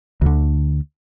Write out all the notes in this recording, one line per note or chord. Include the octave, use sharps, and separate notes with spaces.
D2 D3